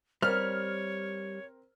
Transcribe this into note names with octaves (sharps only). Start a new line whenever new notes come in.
G3 C4 A#4 C#5 F6